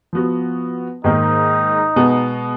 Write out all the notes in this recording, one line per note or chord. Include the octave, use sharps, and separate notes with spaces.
F3 B3 F#4
G#2 D#3 A#3 D#4
B2 G#3 B3